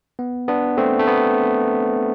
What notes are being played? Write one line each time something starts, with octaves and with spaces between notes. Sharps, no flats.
B3
B3 D4
A3 C4
A3
B3